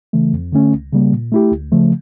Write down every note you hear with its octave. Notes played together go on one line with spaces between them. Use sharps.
C#3 E3 A3
F2
D3 A3 C#4
C#2
C#3 G3 A#3
A#2
A3 E4 G4
D2
C#3 F3 A3